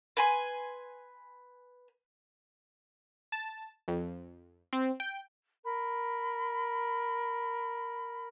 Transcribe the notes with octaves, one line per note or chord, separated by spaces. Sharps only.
B4 G#5 C6
A5
F2
C4
G5
A#4 B5